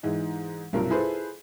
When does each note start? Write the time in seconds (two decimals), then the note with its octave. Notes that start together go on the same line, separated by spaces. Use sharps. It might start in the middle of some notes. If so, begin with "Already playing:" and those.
0.03 G#2 E3 D#4
0.73 B1 G2 C3 F4 A#4
0.90 E4 F4 G#4 A4 B4 C5